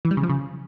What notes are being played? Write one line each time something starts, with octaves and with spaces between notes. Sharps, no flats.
E3
G3
C#3
F3
C#3